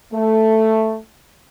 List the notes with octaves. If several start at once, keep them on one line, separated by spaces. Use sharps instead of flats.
A3